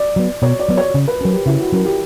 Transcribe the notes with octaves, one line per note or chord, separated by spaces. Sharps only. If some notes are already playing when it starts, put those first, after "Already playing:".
Already playing: D5
F#3 B3
B2 C#5
D5
F#3 B3
C#5
C#3
B4
F#3 C#4 A#4
G4
C#3 E4
F#4
F#3 C#4 A#4
G4